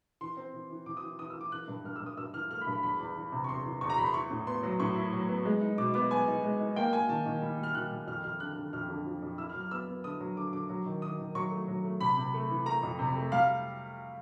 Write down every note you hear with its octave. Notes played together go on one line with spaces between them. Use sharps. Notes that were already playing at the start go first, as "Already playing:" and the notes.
E3 C6
C4
E3
E3
E3 D6
D#6
E3
E3 D#6
E6
E3
D6
E3 F#6
G2
G2 F6
E6
G2
D#6
G2 E6
E3 F6
A3 F6
B5
G2
B5
E2 B5
E2
E3
C3
C#6
E2 C6
E3
E2 C#6
A#5
E2 B5
C6
E4 C#6
A2
B3 C6
F#3
A2 C#6
E4
F#3
B3
G#3
D#4
B2 D6
B3 D6
B3 G#5
D#4
G#3
D#4
A#3 G5
A#3 G#5
D#3 A5
D#3
G3
G3
F6
D#3 F#6
G3
F2 F6
F2 F6
D3 F#6
D3
F2 F6
D3
F3
F2
E4 E6
F6
F#3
F6
B3 E6
B3
D3 D#6
F#3
D3 D6
D3 D6
F#3
D#3
D#3 D#6
D#3
F#3 C#6
A3
F#3
A3
C3 B5
C3
A3
E3
A3 A#5
F2
C3
A3
G3 F5